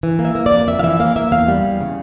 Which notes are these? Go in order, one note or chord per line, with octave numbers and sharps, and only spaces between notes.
E3
A#3
E5
A#3
D5
F2
F2 E5
F5
E3 E5
A#3 F5
A#3 E5
E2 F5
G3
E2
C#3